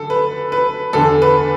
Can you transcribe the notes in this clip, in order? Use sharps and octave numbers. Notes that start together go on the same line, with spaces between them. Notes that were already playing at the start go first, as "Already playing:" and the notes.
Already playing: F#2 D3 A4
B4
B4
E2 D3 A4
B4